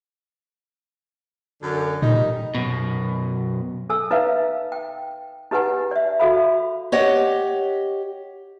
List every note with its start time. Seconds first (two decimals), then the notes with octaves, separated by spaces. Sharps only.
1.62 F#2 D3
2.02 A#2 D#3 G3 D#4
2.55 F#2 B2
3.90 A4 G#5 E6
4.11 D#4 B4 E5 F5
4.72 G5
5.51 D#4 G4 B4 F#5 G#5
5.91 D5 E5
6.20 F#4 A4 E5 F5 B5
6.92 G4 C#5 D#5 F#5